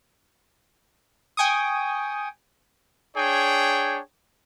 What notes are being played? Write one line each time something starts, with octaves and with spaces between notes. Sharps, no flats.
G5 G#5 C#6 D#6
D4 G#4 C#5 G5